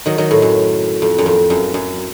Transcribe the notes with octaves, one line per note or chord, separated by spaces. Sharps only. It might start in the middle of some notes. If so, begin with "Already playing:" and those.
D#3 F#3
D#3 F#3
A2
F#2
F2
F#2
F2
F#2
F#2